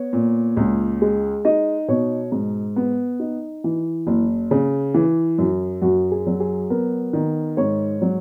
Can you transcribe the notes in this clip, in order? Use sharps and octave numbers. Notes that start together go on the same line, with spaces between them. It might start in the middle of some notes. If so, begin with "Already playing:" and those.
Already playing: B3 C#5
A#2
C#2
G#3
D#4 D#5
B2 C#5
G#2
B3
D#4
E3
F#1
C#3
E3
F#2
F#2 F#4
G#4
F#3
G#4
B3 A#4
D#3
G#2 C#5
F#3